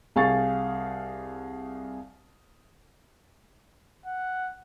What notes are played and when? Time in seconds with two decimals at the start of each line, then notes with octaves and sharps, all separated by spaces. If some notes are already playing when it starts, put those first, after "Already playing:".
0.16 C2 G#4 F5 C#6 A6
4.06 F#5